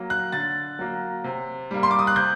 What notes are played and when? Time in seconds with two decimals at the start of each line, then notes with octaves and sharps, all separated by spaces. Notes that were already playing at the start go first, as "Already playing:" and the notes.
Already playing: F#3 A#3
0.10 F#6
0.32 D3 A6
0.79 F#3 A#3
1.24 C3
1.71 G3 A#3
1.83 C6
1.91 D6
1.99 D#6
2.07 F#6
2.16 C3 G6